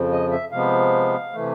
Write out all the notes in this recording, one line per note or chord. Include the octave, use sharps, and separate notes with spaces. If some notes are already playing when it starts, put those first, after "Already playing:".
Already playing: F2 C#3 F3
D#5
E5
C3 F3 G#3 B3 F5
C3 E3 A3